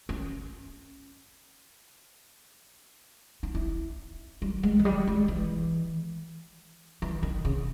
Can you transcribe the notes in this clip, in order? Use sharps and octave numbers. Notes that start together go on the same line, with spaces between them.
C#4
D#4
E4
G3
G#3
E3
G3
G#3
E3
E3
D#3
C#3